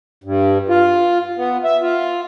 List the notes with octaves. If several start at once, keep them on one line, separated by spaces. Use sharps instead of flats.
G2
F4
B3
E5
F4